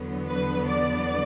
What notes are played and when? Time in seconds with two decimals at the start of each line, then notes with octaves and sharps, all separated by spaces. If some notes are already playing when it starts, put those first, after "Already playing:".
Already playing: E2 D3 F#3 B3
0.29 B4
0.67 D5